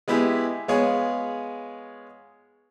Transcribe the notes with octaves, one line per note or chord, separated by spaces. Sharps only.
G#3 B3 E4 G4 G#4
G#3 B3 F4 G#4 C#5